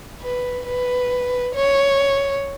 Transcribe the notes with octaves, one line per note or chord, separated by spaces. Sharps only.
B4
B4
C#5